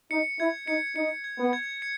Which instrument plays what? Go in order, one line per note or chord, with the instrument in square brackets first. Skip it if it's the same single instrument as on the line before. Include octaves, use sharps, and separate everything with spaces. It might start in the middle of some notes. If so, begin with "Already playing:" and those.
[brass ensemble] D#4 [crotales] C#7
[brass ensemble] E4 [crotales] G#6
[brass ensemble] D#4 [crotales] C#7
[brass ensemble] D#4 [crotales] C#7
[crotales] G#6
[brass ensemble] B3
[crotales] G#6
C#7